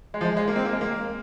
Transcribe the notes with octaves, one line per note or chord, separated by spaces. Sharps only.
G#3
F3
G#3
G#3
A#3
C4
A#3
G#3
A#3